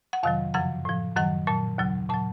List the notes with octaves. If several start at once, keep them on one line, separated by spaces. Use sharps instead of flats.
F#5
F2 C3 D#3 F#3 F5
F#2 C#3 F3 F#5
A2 F3
F#2 D#3 F#3 F#5
A#2 F#3 A5
D#2 C#3 F#3
A#2 F#3 A5